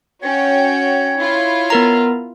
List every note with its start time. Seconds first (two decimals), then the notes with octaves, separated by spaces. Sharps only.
0.22 C#4 F#4 C#5 G5
1.17 E4 F4
1.70 B3 A#4 A#5